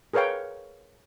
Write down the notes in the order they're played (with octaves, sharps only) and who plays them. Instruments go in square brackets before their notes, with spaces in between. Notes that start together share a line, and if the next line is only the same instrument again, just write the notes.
[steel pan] G#4 A#4 B4 C#5 F5 G5